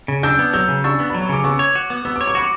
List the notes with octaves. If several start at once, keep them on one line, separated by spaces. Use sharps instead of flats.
C#3
D4 E6 G6
B3
F#3 E6 G6
C#3
D4 C#6 E6
B3
F#3 B5
C#6
C#3 D6
B3 C#6 E6
C#5
F#4
B3
B3 E6
C#5 D6
C#6
F#4 B5 D6